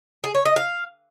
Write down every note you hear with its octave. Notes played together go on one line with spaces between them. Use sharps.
G#4
C#5
D#5
F5